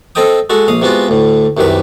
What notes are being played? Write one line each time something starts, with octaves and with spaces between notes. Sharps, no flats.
C4 A4 D#5 G5 D#6
G#3 F#4 A4
A#1 F5 D#6
C3 G#3 B3 F4 F#4
D2 A2
C2 F#2 C3 D#3 B4